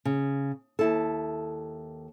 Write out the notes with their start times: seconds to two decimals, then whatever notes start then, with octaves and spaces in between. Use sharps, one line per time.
0.05 C#3
0.79 D#2 E4 A4